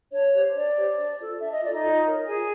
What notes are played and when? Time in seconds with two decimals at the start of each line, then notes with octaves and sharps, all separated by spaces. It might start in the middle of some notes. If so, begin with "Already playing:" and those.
0.12 D4 C#5
0.33 G4 C5
0.54 D4 D5
0.77 G4 C5
0.98 D4
1.19 F4 A4
1.41 D4 E5
1.51 D#5
1.62 F4 A4 D5
1.72 D#4 D#5
1.83 F4
2.05 A#4 C#5
2.26 F4 G#4 G#5